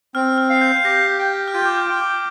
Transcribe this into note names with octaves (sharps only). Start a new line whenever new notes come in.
C4 F6
F6
F5
G6
G6
G4 A#6
G5
F6
F4 G6
D6
F6
G5
D6